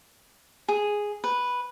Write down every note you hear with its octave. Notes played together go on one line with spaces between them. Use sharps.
G#4
B4